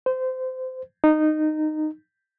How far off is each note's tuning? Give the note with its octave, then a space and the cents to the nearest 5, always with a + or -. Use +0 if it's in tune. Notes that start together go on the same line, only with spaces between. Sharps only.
C5 -25
D#4 -15